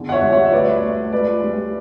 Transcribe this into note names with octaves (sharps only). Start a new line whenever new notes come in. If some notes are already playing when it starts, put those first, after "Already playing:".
Already playing: E2 D3
F#5
C#5 E5
G3
C#5 E5
E5
D2 B4 D5
A3
C#2 B4 D5
G3